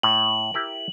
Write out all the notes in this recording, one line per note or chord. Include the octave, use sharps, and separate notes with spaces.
A2 F#7
E4 G4 A#4